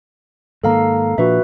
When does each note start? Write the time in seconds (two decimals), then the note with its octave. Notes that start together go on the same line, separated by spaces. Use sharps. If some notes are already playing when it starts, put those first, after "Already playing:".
0.64 G#2 D#3 A#3 A4 F5 A#5
1.18 A#2 F3 D4 F#4 B4 E5